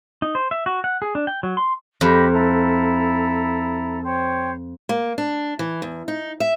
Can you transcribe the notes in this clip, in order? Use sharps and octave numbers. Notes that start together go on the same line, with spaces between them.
D#4
C5
E5
F#4
F#5
G#4
D4
G5
F#3
C6
F2 G4 D#5 B5
E4 A4 A#5
C5 C#5 G5
A#3
D4
E3
E2
D#4
E5